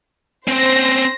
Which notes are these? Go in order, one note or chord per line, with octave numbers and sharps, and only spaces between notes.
C4 C#4 C5 A#6